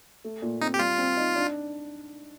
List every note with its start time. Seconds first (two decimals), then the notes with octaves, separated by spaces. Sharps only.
0.24 A3
0.42 A#2
0.62 C4 D#4
0.74 G4
0.79 G3 F4
0.98 C4
1.17 D#4
1.36 D4